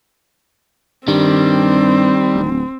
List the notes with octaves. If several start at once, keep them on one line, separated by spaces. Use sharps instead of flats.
G2 D#3 G3 C4
D1